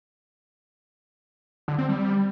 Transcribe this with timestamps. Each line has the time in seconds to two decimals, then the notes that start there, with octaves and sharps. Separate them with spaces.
1.68 D3
1.78 C4
1.89 G3